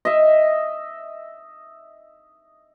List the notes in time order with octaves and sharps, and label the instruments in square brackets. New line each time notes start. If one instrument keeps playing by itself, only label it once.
[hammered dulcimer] D#5 E5